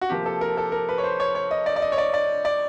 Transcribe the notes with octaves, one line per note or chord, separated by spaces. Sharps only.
F#4
C3 F3 A#3 G4
A4
A#4
A4
A#4
B4
C#5
C5
C#5
C#5
D#5
D5
D5
D#5
C#5
D5
D5
D5